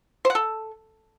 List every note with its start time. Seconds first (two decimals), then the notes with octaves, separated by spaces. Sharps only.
0.25 C5
0.30 F#5
0.35 A4